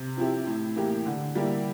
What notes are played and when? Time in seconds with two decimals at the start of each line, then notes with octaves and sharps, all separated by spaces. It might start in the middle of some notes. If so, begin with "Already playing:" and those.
Already playing: C3
0.17 F3 C4 E4 G4
0.47 A2
0.76 E3 A#3 E4 G4
1.06 D3
1.35 G3 A#3 E4 G4